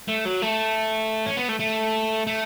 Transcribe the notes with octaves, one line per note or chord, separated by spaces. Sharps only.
A3
F#3
A3
C#4
B3
A3
A3
A3